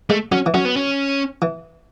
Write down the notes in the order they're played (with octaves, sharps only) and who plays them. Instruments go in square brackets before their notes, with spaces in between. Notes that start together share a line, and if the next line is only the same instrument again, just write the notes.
[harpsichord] G#3 [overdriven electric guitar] A3
[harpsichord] F#3 [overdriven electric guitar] C#4
[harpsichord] E3
[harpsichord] F#3 [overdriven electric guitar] C#4
[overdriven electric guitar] B3
C#4
[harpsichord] E3